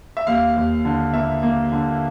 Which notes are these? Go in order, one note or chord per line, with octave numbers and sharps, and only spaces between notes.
E5
D#2 F5
D#2
D3
A#3 E5
A#3
D3